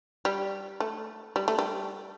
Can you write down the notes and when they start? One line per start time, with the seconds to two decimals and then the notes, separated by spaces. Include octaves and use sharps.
0.25 G3
0.80 A3
1.36 G3
1.48 A3
1.59 G3